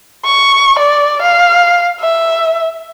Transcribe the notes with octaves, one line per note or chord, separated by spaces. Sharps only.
C#6
D5
F5
E5